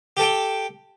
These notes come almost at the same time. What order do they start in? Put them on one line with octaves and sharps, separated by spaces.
G4 A4 G5